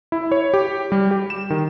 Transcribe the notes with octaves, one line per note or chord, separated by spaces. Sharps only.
E4
C#5
G4
G3
G4
E7
D#3